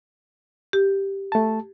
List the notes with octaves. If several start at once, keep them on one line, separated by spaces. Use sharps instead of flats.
G4
A3 A5